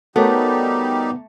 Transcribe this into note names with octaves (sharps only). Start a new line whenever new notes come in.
G3 A3 B3 D#4 F#4 G4 A#4 C#5